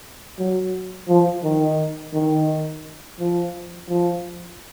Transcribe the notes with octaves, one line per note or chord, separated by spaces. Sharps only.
F#3
F3
D#3
D#3
F3
F3